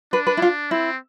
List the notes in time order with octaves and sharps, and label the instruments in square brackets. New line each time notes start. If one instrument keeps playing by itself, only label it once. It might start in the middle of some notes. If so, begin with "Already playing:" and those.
[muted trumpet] D4 [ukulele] B4
[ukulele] B4
E4
F4
[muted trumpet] C4 [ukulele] E4